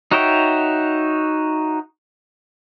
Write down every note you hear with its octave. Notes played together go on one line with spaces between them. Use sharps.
D#4 F#4 C#5 E5 G5